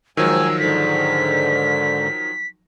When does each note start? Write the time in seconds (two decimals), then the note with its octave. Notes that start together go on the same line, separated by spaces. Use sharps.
0.17 G#2 D#3 F3 F#3 G#5 E6
0.59 G#2 D3 B6